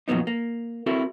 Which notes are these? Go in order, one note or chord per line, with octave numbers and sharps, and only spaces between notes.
F2 A#2 F#3 B3 D#4
A#3
C4 E4 F#4 A4 A#4